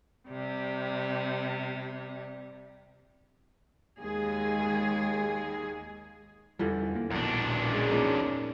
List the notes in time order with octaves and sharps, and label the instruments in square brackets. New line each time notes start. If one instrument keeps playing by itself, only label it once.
[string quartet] C3 G3
[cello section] D#2 G#3 G#4
[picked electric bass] E2 G3 [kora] D3 E3 F3
[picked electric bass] A#3
[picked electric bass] D#1 A#1 B2 [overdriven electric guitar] F#2 D4
[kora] G#3
A#2 C#4 D#4